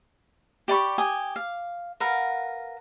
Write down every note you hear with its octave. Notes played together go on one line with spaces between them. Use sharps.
G4 D5 B5 C#6
G4 G#5 D#6
F5
A#4 B4 F5 F#5